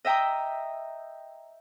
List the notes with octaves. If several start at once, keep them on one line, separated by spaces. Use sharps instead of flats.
D#5 E5 G5 A#5 D#6